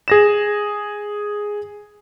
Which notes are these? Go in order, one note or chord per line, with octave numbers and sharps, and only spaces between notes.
G#4 A#6 E7